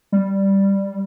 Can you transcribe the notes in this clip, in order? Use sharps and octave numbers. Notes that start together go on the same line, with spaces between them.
G3